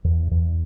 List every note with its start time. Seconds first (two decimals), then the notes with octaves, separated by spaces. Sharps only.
0.04 E2
0.31 E2